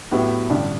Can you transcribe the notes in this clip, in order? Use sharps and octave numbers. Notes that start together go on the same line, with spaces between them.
A2 F#3 B3 E4 G4
A1 G2 D3